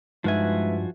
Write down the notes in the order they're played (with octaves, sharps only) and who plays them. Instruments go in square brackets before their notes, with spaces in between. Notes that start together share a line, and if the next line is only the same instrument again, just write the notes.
[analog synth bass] G2 [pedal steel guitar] F3 F#4 G#5 [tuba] G#3 [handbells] D#4 B4 E5